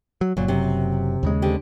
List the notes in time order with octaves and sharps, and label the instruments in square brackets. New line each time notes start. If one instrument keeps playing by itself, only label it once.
[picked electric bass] F#3
[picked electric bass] F#1 F#3 [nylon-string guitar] A#2
[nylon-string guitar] F#2 C3
[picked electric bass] D#2 C#3 G#3
[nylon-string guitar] D3 C4 G4